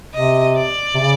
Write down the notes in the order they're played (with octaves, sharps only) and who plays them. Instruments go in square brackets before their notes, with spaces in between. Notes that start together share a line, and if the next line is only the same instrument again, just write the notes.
[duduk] C3 [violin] D#5
[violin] D5
[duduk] C3
C#3